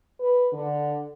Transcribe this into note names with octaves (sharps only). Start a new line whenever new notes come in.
B4
D3